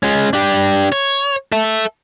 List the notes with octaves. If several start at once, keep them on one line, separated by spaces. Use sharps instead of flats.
G#3 C#4
D4 G4
C#5
A4 E5